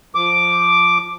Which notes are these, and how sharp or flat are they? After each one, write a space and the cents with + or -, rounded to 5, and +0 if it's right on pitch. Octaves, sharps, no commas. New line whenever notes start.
F3 +0 D6 +0